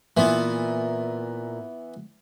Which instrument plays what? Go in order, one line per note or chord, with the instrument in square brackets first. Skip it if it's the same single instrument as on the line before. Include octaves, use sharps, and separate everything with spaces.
[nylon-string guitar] A#2 [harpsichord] E3 B3